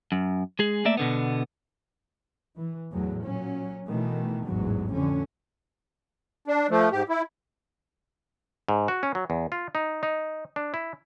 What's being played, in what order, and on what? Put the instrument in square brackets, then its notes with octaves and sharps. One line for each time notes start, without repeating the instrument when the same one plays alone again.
[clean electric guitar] F#2
G#3 G#4
A3 A#3 D5 E5
B2 D3 B3
[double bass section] E3
E2 A2 F#3
A#2 F#3 C#4
B2 D#3 E3 A3
A1 E2 G#2 F#3
F2 D3 C#4
[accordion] D4
F3 A3
G#2 G4
E4
[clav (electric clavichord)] G#2
F#4
C#4
F#3
E2
F4
D#4
D#4
D4
E4